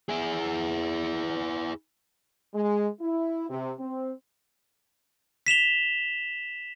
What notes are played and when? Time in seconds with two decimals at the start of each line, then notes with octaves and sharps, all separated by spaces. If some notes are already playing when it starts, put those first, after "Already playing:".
0.09 E4 G#4
2.54 G#3
3.01 E4
3.50 C3
3.79 C4
5.47 B6 E7 F7 G7